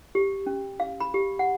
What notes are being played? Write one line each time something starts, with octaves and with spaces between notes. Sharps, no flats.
G4
C#4
F5
B5
G4
F#5